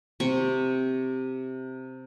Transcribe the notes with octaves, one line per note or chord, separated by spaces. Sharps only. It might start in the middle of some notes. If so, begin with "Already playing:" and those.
C3 C4 C#6